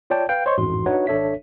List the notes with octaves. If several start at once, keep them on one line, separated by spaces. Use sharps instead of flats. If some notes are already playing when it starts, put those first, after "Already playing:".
F4 C#5 D5 G5 A5
B4 F5 G5
C5 C#5 D#5 C6 C#6
A1 F2 G#2 F#4 C6
D4 D#4 F#4 B4 C#5 F#5
G#1 D4 A4 C#5 E5 B6